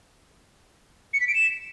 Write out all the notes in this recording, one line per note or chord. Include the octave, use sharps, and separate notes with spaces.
C#7
B6
D7
E7